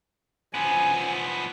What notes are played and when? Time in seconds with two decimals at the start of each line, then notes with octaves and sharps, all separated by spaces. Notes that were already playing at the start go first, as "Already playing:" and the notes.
0.54 F3 B3 G#5